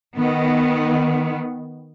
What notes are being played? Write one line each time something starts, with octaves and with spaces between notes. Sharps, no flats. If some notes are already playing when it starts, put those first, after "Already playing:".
D#3 B3